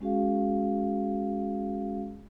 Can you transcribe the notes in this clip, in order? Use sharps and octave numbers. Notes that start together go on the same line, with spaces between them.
G#3 C#4 F#4 G#4 F5